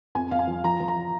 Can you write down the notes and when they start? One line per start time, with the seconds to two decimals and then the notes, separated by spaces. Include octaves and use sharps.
0.15 F2 G#5
0.31 F2 F5
0.39 G#5
0.47 F3
0.64 F3 A#5
0.80 F3
0.88 A#5